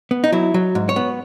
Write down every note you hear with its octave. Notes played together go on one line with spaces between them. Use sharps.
B3
D#4
F#3 E4
F#3
G#2
C#5
B3